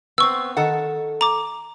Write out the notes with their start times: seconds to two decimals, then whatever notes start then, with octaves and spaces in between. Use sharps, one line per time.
0.18 B3 C4 C#6 E6
0.57 D#3 A4 F#5
1.21 A#5 D6